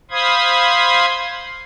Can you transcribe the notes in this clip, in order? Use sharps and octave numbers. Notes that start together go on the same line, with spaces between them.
C5 F5 B5 C6 D#6 G#6